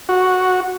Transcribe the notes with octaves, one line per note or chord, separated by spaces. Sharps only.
F#4